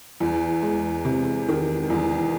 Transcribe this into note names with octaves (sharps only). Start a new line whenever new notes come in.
E2
G#3
C3
D#3
E2